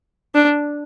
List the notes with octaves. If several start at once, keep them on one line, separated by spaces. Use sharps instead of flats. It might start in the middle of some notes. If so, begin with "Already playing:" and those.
D4